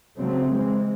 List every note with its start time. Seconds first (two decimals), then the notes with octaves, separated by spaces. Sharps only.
0.18 C#3 F#3 A3 C4
0.52 E3 G#3 C4